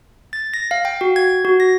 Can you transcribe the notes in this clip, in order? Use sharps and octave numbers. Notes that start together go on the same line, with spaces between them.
A6
A#6
F5
G5
F#4
G#6
F#4
A#6